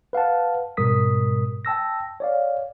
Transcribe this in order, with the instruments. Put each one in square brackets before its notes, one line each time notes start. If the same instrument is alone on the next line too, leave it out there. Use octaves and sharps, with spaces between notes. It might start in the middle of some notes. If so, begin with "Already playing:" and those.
[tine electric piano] B4 F5 F#5 A5
G#2 B2 G3 A#4 D#6 B6
G5 A5 E6 A#6
C#5 D5 F5